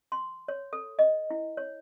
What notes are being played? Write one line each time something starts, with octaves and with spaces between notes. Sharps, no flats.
C6
C#5
A4
D#5
E4
C#5